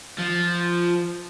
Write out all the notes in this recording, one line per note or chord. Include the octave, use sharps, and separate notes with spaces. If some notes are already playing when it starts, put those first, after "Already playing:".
F3